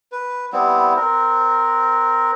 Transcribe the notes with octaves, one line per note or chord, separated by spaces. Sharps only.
B4
G3 B3 C4 E4
C4 A#4